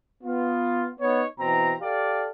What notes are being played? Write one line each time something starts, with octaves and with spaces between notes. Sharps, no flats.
B3 F4
B3 D#4 C#5
B2 E3 C4 A#5
G4 A4 D5 F5